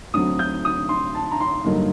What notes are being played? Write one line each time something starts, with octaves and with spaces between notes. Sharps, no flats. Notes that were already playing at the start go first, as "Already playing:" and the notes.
D2 D3 F#3 C4 D#6
G6
D#6
C6
A5
A#5
C6
G2 D3 F#3 A#3 D#4